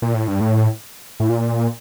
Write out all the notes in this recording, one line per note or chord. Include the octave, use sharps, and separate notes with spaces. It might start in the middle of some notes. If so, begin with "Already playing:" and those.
A#2
A2
G2
A2
A2
A#2